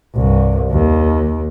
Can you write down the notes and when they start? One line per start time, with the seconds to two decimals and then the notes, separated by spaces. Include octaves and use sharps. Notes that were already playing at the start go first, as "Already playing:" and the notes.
0.15 C2 G2
0.71 D#2